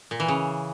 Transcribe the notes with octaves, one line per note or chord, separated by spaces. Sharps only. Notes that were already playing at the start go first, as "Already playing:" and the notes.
A#2
E3
C#3